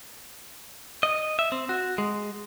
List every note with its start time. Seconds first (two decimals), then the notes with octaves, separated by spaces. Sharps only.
1.03 D#5
1.39 E5
1.52 C4
1.69 F#4
1.98 G#3